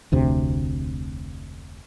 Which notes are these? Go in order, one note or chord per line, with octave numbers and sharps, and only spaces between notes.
F1 D2 C3